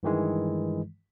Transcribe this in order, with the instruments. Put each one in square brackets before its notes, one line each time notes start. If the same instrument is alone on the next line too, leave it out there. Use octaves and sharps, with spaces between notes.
[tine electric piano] G2 D#3 E3 G#3